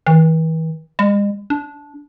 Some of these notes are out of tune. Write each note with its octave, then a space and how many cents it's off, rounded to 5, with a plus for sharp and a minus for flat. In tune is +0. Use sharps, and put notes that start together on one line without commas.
E3 -40
G#3 -40
D4 -15